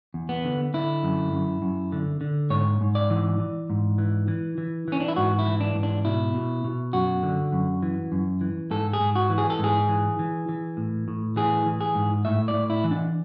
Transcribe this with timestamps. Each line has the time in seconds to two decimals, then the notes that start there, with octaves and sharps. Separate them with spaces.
0.14 E2
0.29 B3
0.44 D3
0.74 D3 E4
1.04 F#2
1.32 F#2
1.62 F#2
1.92 D3
2.21 D3
2.50 G#2 C#5
2.81 G#2
2.95 D5
3.10 E3
3.40 E3
3.70 G#2
3.98 E3
4.28 E3
4.58 E3
4.88 E3 C#4
5.00 D4
5.08 E4
5.16 G#2 F#4
5.39 E4
5.46 E3
5.61 D4
5.75 G#2
5.83 D4
6.05 B2 E4
6.34 B2
6.64 B2
6.93 F#2 F#4
7.23 D3
7.52 F#2
7.83 E3
8.12 F#2
8.41 E3
8.70 G#2 A4
8.93 G#4
9.00 G#2
9.16 F#4
9.30 E3
9.38 G#4
9.50 A4
9.59 G#2 G#4
9.89 E3
10.19 E3
10.49 E3
10.77 A2
11.08 A2
11.36 E3 G#4
11.66 E3
11.81 G#4
11.95 G#2
12.25 A2 E5
12.48 D5
12.54 A2
12.70 E4
12.84 E3
12.91 D4